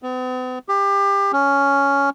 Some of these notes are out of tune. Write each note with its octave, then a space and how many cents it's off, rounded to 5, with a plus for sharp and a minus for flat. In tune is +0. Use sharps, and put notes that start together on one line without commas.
B3 +45
G4 +25
C#4 +10